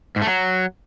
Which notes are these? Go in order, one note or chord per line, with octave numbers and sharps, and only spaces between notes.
G#2
A3
F#3